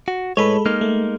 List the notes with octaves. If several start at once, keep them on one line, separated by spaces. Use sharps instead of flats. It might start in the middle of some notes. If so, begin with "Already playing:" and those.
F#4
A2 G#3 A4 B4 C#5 B5
G#3 A#3 D#4 F6
A3